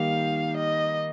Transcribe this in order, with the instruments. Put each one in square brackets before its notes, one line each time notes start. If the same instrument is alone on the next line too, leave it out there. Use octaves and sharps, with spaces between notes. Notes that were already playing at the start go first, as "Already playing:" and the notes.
Already playing: [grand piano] D#3 G3 A#3 D#4 [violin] F5
[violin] D#5